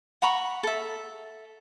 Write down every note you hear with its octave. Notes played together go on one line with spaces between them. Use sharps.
F#5 A#5 B5 C#6
A4 E5